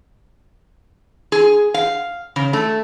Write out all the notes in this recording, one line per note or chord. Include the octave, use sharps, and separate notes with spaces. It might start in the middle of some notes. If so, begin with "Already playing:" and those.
G#4
F5
C#3
A3